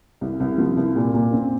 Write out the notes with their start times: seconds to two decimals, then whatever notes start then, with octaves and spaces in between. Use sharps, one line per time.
0.21 C2
0.40 C2
0.58 F3
0.77 C2
0.96 A#2
1.14 A#2
1.33 C4